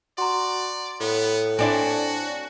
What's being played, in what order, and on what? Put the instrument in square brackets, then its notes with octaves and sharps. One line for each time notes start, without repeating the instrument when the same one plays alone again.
[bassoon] F#4 [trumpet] D5 [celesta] A#5 C6
[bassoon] A2 [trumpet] B3
[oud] C4 D4 E4 [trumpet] F#4 [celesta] G#5